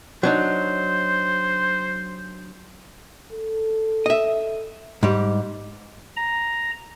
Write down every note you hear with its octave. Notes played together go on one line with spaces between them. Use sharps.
F#3 D4 D#4 C5
A4
D#5 E5
G#2 G3
A#5